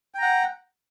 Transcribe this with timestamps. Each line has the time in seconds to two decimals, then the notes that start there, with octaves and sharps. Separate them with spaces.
0.14 G5
0.18 A#5
0.22 F#5